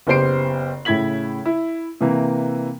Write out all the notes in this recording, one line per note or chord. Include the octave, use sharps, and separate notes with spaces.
F#1 B3 G4 C5 C7 D7
A2 C#3 E4 G#6 B6 F#7
E4
C3 E3 A#3